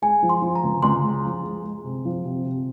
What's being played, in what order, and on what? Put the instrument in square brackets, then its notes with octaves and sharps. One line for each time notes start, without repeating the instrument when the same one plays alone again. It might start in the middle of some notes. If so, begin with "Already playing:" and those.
[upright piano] G#3 [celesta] G#5
[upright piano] F3
[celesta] C6
[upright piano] F3
[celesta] A#5
[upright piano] C#2
[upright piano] C#2 [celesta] C6
[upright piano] G#3
F3
G#3
G#3
C3
F3
C3
C3